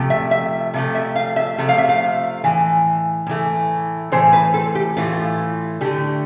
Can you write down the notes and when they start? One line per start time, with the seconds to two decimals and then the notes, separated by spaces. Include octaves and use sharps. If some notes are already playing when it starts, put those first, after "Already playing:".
Already playing: C3 F3 A3
0.10 E5
0.31 E5
0.74 C3 F3 A3
0.95 E5
1.16 F5
1.36 E5
1.58 C3 F3 A3
1.69 F5
1.78 E5
1.89 F5
2.44 A2 E3
3.27 A2 E3 A3
4.12 A2 E3 A3 C5
4.33 B4
4.54 A4
4.75 G4
4.97 A2 E3 A3 F4
5.81 D3 A3 G4